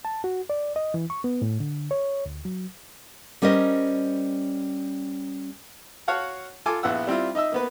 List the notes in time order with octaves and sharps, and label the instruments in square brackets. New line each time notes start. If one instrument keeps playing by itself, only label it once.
[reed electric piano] A5
F#4
D5
D#5
E3
C#6
B3
A2
D3
C#5
D2
F#3
[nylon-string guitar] G3 C#4 A#4 C5 D#5
[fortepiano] F#4 C#5 F5 F#5 A5
F4 A4 G#5 D6
A#1 B3 E4 F#5 E6
G3 C4 E4 F4
D#4 D#5 E5 E6
A#3 B3 B4